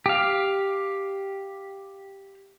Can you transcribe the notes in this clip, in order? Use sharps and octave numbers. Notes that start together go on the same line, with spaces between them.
G4 F5